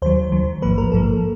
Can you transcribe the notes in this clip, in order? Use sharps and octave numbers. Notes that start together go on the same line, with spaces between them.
D#2 D#3 F#3 C5
D#2 D#3 F#3
A1 G#2 F3 A#3 B4
A#4
A1 G#2 F3 A#3 A4